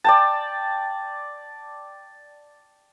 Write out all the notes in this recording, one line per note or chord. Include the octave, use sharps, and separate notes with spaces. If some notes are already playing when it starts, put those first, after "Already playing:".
D5 G5 A5